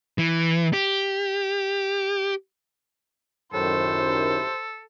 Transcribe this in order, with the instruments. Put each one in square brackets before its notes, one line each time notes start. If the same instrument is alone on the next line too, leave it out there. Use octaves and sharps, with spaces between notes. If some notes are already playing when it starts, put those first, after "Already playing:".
[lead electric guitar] E3
G4
[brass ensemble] F#2 D#3 [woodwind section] A2 C3 [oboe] A4 [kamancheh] C5